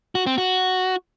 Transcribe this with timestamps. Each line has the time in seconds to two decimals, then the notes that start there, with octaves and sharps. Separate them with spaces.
0.15 F#4
0.26 C4
0.38 F#4